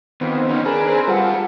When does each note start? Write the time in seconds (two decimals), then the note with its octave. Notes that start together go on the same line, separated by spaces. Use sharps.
0.21 F2 D#3 B3 C4
0.49 C#4 D#4
0.65 D4 G#4 A#4 B4
0.87 C4
1.07 G3 F4 A4 C5 F#5